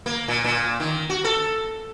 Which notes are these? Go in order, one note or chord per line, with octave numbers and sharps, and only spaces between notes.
A#3
A#2
A#2
D#3
F#4
A4